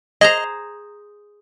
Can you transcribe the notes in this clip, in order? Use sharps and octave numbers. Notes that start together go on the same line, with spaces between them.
G#4 C5 D#5 A#5